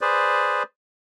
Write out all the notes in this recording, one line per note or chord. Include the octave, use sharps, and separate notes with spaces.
G#4 B4 C5 D5